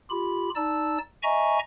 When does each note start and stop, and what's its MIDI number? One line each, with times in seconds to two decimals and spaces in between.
0.10 0.50 65
0.10 0.50 67
0.10 0.50 83
0.56 0.98 63
0.56 0.98 74
0.56 0.98 81
0.56 0.98 88
1.23 1.59 75
1.23 1.59 76
1.23 1.59 80
1.23 1.59 82
1.23 1.59 85